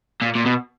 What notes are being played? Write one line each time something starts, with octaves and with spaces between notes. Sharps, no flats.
A#2
A#2
B2